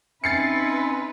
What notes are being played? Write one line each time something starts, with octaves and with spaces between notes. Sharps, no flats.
C4 C#4 D#4 E4 B4 A6 C7 C#7